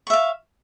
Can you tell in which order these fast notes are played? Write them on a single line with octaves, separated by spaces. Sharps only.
C#6 E5 F5